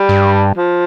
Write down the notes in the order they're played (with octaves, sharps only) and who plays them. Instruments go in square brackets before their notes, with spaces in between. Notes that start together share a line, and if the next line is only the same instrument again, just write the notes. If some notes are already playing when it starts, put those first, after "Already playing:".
Already playing: [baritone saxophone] G3
[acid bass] G2
[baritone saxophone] F3